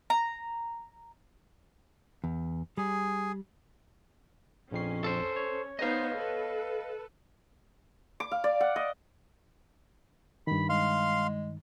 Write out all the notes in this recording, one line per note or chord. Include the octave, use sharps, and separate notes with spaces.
A#5
E2
G3 G#4
A#1 F2 C#4 C7
A4 C5
C#5
B3 D#4 C5 D#5 F5
A4 B4
D6
F5
D5
F#5
D#5
G2 D#3 B5
G#3 F5 C6